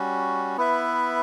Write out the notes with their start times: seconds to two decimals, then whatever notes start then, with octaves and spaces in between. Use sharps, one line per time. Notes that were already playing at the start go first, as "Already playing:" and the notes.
Already playing: G3 C#4 F#4
0.57 B3 E4 B4 E5